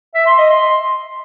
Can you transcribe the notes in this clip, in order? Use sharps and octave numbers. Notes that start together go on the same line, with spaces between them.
E5
C6
D#5
C6